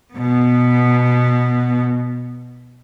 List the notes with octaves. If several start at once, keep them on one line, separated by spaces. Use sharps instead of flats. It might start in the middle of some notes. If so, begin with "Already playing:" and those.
B2 B3